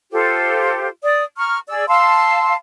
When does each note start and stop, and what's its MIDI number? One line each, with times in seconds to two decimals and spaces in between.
0.12 0.87 65
0.12 0.87 67
0.12 0.87 69
0.12 0.87 72
1.04 1.24 74
1.04 1.24 87
1.37 1.59 82
1.37 1.59 85
1.37 1.59 89
1.68 1.86 68
1.68 1.86 74
1.68 1.86 88
1.88 2.54 77
1.88 2.54 81
1.88 2.54 84
1.88 2.54 88